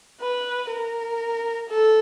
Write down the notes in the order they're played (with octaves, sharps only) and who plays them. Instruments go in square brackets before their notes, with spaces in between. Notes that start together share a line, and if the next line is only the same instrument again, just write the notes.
[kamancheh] B4
A#4
A4